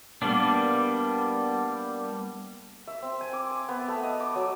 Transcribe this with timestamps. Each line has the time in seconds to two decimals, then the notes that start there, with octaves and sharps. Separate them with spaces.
0.22 G3 A#3 B3 D4
2.87 E5
3.02 C4
3.21 G#5
3.33 D6
3.51 G#5
3.69 B3
3.88 A3
4.03 D#5
4.20 D6
4.35 F#3